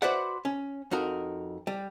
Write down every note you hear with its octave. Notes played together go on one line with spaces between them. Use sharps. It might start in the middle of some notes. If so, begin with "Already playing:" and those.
F#4 B4 C5 D5 E5 F#5
C#4
F2 D#4 F#4 A#4
G3